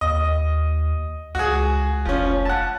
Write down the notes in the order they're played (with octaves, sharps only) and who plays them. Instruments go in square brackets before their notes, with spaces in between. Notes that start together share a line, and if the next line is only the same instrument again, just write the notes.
[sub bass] D#2 [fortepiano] D#5
[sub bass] C#2 [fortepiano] F#4 G#4
[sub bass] F1 [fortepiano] F3 C#4
[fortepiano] F#5 A5